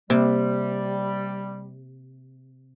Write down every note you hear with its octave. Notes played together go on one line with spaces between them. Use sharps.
C3 G3 A#3